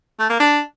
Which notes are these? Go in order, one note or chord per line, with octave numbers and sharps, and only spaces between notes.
A3
A#3
D4